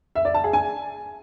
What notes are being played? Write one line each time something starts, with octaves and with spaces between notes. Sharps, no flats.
E5
D5
A5
G#4
G#5